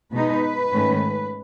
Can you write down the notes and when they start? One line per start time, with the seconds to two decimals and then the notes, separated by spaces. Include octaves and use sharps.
0.12 B2 G#3 D#4 B4
0.72 G#2 D#3 A3 C#4